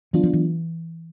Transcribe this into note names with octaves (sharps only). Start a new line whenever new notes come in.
E3 F#3 B3 D4 F4
F3
E3